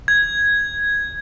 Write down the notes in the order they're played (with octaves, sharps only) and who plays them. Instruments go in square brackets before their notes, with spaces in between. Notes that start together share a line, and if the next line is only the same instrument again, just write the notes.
[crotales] G#6